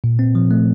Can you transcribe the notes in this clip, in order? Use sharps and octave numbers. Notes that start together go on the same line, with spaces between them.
A#2
C4
F3
A3